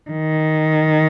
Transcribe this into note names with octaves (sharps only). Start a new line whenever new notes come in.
D#3